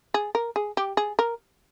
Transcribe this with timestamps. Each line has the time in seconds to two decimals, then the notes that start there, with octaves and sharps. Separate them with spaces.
0.14 G#4
0.35 A#4
0.56 G#4
0.77 G4
0.97 G#4
1.19 A#4